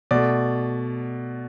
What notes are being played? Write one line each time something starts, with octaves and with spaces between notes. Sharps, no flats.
B2 A3 D5